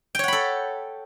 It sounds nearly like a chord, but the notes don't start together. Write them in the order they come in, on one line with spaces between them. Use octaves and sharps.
G5 C#5 F#5 B5 A4